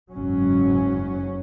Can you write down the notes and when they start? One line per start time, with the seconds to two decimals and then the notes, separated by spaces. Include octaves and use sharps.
0.12 F#1 G#2 F#3 C#4